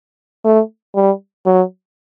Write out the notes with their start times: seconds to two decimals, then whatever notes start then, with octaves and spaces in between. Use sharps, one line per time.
0.45 A3
0.95 G3
1.46 F#3